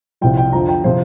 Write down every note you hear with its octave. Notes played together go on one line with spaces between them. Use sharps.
C2 C3 F3 G5
G5
F2 D3 F3 A#5
G5
C3 F3 C5